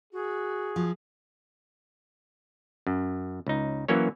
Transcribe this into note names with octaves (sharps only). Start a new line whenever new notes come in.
F#4 G#4
F3
F#2
C#2 D#4
E3 F#3 A#3 C#4 C#5